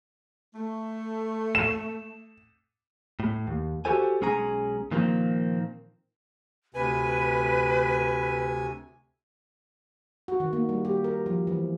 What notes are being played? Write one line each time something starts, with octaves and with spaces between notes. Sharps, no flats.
A3
E7
A2
D#2
F#4 G4 A4 C5 G#5
B1 G#3 C#4 G#4 G#5 A#5
A#2 D#3 F3 A#3 C4
D2 C3 B4 G#5
F#4
D#3
A#3
G3
G4
A#4
F3
E3